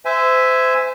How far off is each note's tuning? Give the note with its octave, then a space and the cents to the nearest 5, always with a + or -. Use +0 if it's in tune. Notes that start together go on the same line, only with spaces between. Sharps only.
C5 -30 E5 +0 G#5 +0